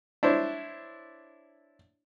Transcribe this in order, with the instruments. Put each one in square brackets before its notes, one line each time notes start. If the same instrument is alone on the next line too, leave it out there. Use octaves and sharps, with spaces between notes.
[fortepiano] D4 E4 C5 C#5